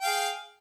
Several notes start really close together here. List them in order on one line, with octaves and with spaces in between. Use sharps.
G5 F5 G#4